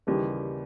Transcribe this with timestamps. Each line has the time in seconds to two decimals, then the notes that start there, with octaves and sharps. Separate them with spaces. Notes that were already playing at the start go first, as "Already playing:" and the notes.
0.07 D#2 C#3 E3 G3